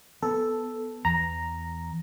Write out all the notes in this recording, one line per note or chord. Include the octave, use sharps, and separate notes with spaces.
B3 A4
E2 A#5